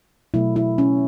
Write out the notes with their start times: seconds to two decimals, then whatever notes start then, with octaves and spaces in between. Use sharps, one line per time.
0.34 B2 F#3 A3 E4
0.56 E4
0.78 C#4